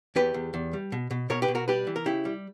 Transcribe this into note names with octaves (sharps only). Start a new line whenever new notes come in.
E2 G4 B4
E2
E2
G3
B2
B2
B2 A#4 C#5
G4 B4
B2
F#4 A#4
G3 G4 B4
E3
A#4
C#3 E4 G4
G3